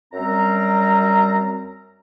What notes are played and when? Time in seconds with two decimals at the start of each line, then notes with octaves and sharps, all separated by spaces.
0.13 F#2 G3 C4 A#5